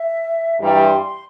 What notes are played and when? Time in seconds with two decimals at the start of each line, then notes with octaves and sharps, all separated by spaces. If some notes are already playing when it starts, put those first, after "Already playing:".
Already playing: E5
0.61 G2 E3 G3 A#5
0.81 C6
1.01 C6